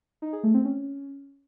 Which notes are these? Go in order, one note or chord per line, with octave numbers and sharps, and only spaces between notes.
D#4
G#4
A3
C4
C#4